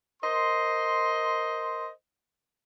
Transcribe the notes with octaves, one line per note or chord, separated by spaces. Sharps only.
A#4 C5 D#5 C6